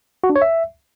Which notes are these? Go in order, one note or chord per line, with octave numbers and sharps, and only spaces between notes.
F#4
D4
C#5
E5